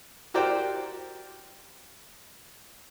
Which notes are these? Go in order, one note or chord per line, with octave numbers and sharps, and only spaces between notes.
F#4 G4 A#4 C5 D5 G5